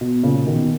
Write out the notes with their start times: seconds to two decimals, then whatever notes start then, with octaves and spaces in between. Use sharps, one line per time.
0.01 B2
0.23 A#2 C#3
0.47 B2 D#3